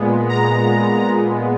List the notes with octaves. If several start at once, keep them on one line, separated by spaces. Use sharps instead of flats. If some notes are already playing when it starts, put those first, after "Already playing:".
Already playing: A#2 G#3 B3
A#5